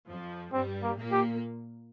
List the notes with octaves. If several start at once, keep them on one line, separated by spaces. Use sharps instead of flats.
F2 F3
G2 G3 C4
A#3
A#2 A#3
G4